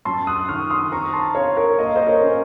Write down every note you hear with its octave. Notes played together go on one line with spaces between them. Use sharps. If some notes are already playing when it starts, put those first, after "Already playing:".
F#2 A5 C6
D#6 F#6
D#3 C#6 F6
C6 D#6
C4 A#5 C#6
A5 C6
C4 C#5 F5
A#4 C#5
A#3 D#5
F5
C5 D#5
A#4 C#5
C#4